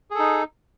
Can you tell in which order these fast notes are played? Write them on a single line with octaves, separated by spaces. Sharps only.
G#4 A4 D#4